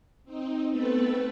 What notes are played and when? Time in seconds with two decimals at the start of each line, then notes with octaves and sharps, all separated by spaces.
0.24 C4 D#4
0.69 A3 B3 C4 A4 B4